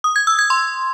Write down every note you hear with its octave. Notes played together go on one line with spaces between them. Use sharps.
D#6
G#6
E6
G#6
C6